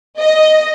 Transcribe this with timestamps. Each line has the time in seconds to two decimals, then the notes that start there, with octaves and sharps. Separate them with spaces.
0.18 D#5